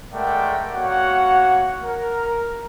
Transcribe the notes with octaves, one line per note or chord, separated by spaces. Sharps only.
G#3 A3 A#4 D5 F#5 G5
A#3 F#4 C#5 F#5
A#4